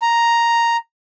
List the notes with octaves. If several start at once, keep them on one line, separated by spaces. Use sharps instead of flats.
A#5